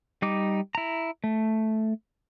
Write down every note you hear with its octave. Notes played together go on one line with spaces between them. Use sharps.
G3 D#4 D6
E4 A#5
A3